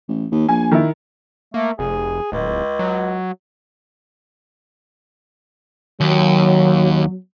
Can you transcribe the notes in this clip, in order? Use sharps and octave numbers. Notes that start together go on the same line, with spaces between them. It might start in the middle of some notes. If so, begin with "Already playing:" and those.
A1
D#2
A#1 G#5
D#3 E4
A3 A#3
F1 G#4
D1 C#2
F#3
D#2 F#3